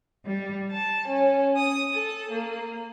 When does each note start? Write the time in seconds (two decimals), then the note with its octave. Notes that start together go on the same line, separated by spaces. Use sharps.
0.25 G3
0.71 A5
1.07 C#4
1.55 D#6
1.92 A4
2.29 A#3